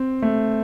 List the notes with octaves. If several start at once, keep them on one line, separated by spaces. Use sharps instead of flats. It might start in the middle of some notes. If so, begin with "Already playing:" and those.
Already playing: C4
A3